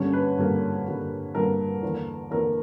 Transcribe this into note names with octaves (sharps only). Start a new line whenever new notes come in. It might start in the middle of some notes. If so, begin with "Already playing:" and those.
Already playing: G2 D3 G3 A#3 C#4 C#5
B4
G2 D3 G3 A#3
G2 D3 G3 A#3
G2 D3 G3 A#3 A#4
E2 D3 A#3
E2 D3 A#3 A#4